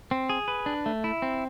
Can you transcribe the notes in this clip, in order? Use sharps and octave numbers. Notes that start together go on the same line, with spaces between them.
C4
G#4
B4
D4
A3
E4
C4